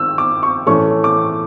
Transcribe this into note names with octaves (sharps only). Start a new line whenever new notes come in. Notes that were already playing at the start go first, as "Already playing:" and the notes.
Already playing: D#3 E6 F6
D6
C#6
A2 E3 A3 C#4 C#6
D6